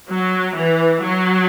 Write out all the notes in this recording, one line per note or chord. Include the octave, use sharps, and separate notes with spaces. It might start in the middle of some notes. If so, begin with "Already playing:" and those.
F#3
E3
F#3